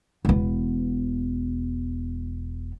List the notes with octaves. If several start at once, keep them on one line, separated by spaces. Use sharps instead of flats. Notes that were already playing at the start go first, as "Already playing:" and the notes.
E1 B3